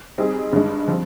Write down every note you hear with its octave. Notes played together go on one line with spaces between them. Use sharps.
G3 C4 D#4 G#4
G2 D#3 G#3 D4
F3 C4